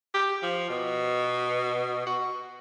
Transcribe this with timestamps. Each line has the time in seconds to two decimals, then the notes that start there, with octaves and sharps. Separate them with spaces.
0.14 G4
0.43 F3
0.70 B2
2.07 F#4